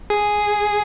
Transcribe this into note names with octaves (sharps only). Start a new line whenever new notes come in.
G#4